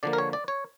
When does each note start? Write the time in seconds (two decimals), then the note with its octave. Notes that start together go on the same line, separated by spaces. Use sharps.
0.03 D3 F3 A#3 D5
0.13 A#4
0.18 C#5
0.33 D5
0.48 C#5